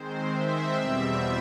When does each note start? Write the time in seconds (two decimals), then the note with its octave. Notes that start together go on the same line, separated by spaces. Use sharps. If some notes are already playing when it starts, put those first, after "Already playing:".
Already playing: D#3 G#3 C4 C5
0.33 E5
0.77 E2 B2 G3 C4